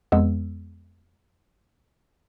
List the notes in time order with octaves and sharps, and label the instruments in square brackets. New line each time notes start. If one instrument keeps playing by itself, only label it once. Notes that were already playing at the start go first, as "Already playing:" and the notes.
[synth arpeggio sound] F2 G#3 B3 E6